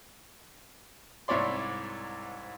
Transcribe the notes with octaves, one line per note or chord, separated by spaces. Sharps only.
C2 G#2 E4 C#5 D5 C6